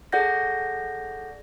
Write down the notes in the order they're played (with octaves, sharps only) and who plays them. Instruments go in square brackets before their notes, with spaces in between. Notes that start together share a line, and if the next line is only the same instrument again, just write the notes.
[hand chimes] G#4 A4 D5 F#5 G6 A#6